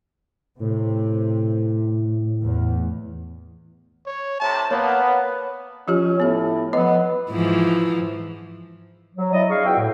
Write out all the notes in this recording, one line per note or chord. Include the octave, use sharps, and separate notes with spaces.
A2 C3
E2
C#5
A2 C3 A5
A#3 B3 C#5
F3 C#4 F4 G4
A2 B3 G4
F3 B3 D#5
G#2 E3 F3
F#3
E4 D5 D#5
D4 G#4 F5 C#6
C#2 B3 E4 F#4 E5 G5
A2